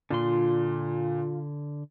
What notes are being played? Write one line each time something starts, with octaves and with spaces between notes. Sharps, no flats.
A#2 D3 F4 C6